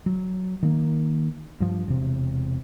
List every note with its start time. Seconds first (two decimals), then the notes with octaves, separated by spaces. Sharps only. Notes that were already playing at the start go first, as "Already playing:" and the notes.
0.06 F#3
0.63 D#3 A#3
1.60 G2 F3
1.88 E1 C3